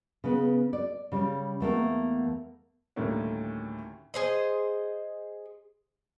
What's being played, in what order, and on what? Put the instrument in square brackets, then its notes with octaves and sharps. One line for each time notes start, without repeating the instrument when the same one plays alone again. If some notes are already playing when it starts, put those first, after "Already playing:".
[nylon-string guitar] C#3 B3
D5
C#3 G3
E2 A3 A#3
[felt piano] D2 A2 D#3 G3 A#3 C#4
[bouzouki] G#4 C5 D#5